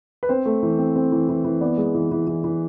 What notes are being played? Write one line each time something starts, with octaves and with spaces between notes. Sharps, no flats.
B4
C4 C5
A3
E3
C4
C4
E3
E3
E3
B3 D5
G#3
E3
E3
E3
E3